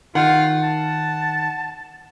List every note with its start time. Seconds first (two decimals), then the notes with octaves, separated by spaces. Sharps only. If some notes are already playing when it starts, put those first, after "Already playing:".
0.15 D#3 F4 F#5
0.63 A5